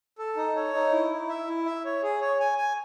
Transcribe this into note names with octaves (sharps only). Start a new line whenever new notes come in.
A4
D#4
C#5
D#4
E4
E4
E5
E4
E5
C#5
G#4
C#5
G#5
G#5